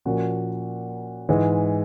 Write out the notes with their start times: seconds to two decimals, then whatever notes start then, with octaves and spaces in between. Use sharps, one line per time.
0.05 A#2 F3 A#3 C#4 F#4
1.29 G#2 E3 G#3